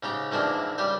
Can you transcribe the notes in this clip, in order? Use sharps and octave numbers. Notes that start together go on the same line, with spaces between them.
G#2 C#3 G4 A#5
G#2 C3 E3 F3 A#3 D4
C#2 G3 G4 C5